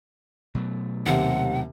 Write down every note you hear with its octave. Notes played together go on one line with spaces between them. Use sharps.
B2 F#3 A3
D#2 C3 F#5